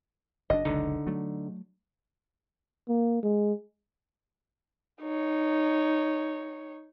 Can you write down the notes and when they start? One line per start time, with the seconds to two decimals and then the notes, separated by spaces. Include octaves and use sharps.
0.50 F#1 D4 D#5
0.65 F#1 C#2 B2 D3 D#4
1.07 F#3 A3
2.88 A#3
3.23 G#3
5.02 D#4 C#5